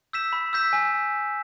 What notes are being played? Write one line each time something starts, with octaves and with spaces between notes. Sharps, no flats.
E6 G6 B6 E7
B5
E6 G6 B6 E7
G#5